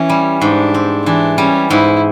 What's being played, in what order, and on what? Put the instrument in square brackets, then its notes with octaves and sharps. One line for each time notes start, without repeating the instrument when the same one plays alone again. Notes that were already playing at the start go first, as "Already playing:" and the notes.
Already playing: [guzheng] E3 [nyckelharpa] C#4
[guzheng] G3
[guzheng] G#2 [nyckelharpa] D4
[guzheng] C4
[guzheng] E3 [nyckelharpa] D4
[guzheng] G3 [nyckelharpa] C#4
[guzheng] G#2 [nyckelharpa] E4